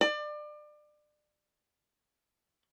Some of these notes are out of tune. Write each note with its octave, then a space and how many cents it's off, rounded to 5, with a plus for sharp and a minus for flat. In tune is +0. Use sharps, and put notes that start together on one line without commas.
D5 +30